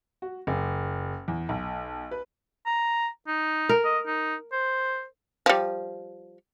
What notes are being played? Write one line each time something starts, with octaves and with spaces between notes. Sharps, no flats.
F#4
F#1
E2
B1
B4
A#5
D#4
A#4
D#5
D#4
C5
F3 G3